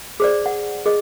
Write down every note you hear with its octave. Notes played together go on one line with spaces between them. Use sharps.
G#4 C5 D5
F#5
G#4 D#5